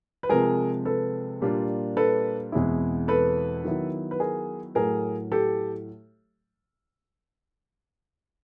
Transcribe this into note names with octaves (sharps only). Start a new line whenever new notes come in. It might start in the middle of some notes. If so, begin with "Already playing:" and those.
B4
C3 F3 G#3 G#4 A#4
A4 B4
A#2 G3 A#3 D4 F4
A4 B4
E2 B2 G#3 C4 E4
A4 B4
D#3 F#3 B3 E4
B4
G#4 A#4
A2 F#3 A3 G#4 A#4
G4 A4